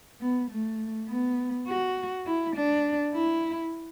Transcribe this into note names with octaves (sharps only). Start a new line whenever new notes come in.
B3
A3
B3
F#4
E4
D4
E4